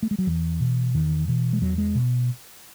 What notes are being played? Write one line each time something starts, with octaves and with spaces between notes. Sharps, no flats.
A3
G#3
F#3
E2 E3
B2
E2 D#3
B2 E3
G#3
E2 F#3
G#3
B2